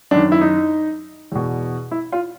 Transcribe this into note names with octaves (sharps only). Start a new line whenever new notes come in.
F#2 D#3 D4
E4
D#4
E2 B2
E4
F4